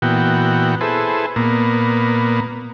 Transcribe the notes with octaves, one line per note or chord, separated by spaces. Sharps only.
A#2 E3 B3 F#4 G5
E4 G#4 A4 B4 C5
A#2 A#3 B3